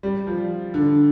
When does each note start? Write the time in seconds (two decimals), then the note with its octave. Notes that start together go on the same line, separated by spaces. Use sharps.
0.03 G3
0.27 F3
0.74 D3